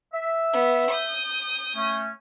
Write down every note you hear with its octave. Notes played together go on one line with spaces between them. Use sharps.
E5
B3
D#6 G6
A3 C#4